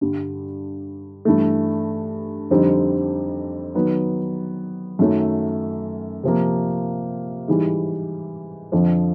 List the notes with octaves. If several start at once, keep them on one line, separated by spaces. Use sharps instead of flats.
G2 D3 G3
G2 E3 A3
F2 D3 G3 C4 D#4
D#3 F#3 B3
F#2 D#3 F#3 A3 C#4
C3 F3 A#3
G#2 E3 G3
F2 D3 F3